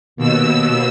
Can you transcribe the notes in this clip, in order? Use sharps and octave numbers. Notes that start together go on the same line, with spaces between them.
D#2 B2 E6